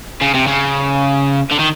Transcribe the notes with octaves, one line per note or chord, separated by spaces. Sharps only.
C#3
C3
C#3
D3
D#3